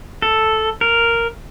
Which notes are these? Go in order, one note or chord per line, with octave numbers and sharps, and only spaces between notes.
A4
A#4